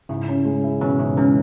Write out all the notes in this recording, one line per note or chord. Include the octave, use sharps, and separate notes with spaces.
G#2 C#3 E4
C#4
G#3
E4
B2 E3 C#4
G#2 C#3 E4
E3 G#3 C#4